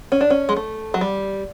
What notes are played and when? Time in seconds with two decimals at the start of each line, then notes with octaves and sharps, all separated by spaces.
0.12 C#4
0.21 D4
0.30 C#4
0.49 G#3
0.56 A3
0.94 F#3
1.01 G3